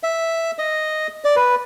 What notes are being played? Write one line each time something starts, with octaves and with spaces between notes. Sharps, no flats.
E5
D#5
D5
B4